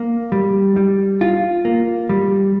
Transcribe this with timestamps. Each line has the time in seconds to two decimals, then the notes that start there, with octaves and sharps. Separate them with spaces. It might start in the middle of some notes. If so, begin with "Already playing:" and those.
Already playing: A#3
0.32 G3
0.76 G3
1.21 F4
1.65 A#3
2.09 G3